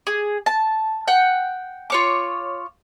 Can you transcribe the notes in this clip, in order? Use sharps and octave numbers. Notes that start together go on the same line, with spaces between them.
G#4
A5
F#5 G5
F4 C#5 D6